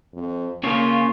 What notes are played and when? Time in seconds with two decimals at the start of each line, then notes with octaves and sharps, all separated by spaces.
0.14 F2
0.64 C#3 A#3 F4 C#5